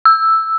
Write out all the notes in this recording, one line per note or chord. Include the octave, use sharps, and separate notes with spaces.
E6